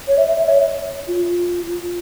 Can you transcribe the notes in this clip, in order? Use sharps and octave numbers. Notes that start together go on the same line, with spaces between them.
C#5
E5
E5
C#5
F4